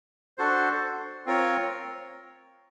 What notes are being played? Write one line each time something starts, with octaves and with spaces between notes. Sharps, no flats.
D4 F#4 A4 C5
C4 F4 A#4 C#5